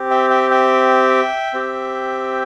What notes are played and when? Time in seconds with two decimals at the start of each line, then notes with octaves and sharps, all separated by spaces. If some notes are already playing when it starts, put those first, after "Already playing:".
Already playing: C4 G4
0.10 E5 G5
0.30 E5 G5
0.51 E5 G5
1.54 C4 G4